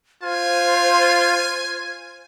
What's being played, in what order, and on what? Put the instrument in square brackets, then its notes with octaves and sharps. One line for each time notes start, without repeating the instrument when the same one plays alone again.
[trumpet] F4 [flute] C5 [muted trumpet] G#5